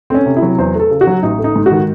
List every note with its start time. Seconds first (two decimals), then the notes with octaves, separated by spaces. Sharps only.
0.10 A3 C4 C#4
0.26 C3
0.37 E4
0.42 F#3
0.58 E2 C5
0.75 A3 A4
0.91 C#3
1.01 F#4
1.07 F#3
1.23 A1 D#4
1.39 A3
1.44 D#4
1.56 G#2
1.66 F#4
1.71 D#3